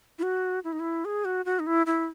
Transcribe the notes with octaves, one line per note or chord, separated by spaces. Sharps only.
E4
F#4
E4
D#4
E4
G#4
F#4
F#4
D#4
E4
E4